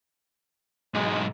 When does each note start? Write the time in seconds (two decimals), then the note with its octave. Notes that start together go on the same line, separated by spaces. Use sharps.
0.94 B1 G#2 G#3